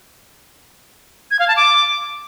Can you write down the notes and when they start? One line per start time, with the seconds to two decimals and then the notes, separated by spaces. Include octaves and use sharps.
1.31 G#6
1.39 F5
1.48 A5
1.56 D6